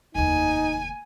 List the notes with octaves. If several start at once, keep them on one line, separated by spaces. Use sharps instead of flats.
F1 D#2 D#4 G#5